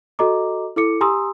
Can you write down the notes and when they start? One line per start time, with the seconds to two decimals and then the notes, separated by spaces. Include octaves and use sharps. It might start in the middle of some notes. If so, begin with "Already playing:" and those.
0.19 F#4 A4 D#5 A#5 D6
0.76 E4 A4 D6 C#7
1.01 G4 G#5 A#5 C6 D#6 E6